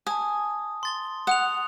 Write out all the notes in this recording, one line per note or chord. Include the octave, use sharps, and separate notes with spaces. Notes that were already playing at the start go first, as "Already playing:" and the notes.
G#5 A5 D#6
C6 A6 G7
F#5 D#6 F#6 F7